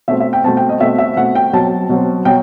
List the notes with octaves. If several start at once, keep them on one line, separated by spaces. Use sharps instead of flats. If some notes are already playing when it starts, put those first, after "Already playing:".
B2 A3 C4 E5
E5
G5
B2 A3 C4 A5
G5
D#5
B2 A3 C4 E5
E5
B2 A3 C4 F#5
G5
B2 F#3 C4 A5
B2 F#3 C4
B2 F#3 G5